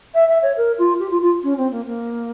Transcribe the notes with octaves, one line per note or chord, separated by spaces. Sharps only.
E5
E5
C#5
A#4
F4
G4
F4
F4
C#4
C4
A#3
A#3